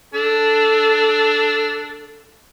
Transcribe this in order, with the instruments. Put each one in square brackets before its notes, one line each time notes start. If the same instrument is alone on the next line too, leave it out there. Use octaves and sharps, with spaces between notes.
[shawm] D4 [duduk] A4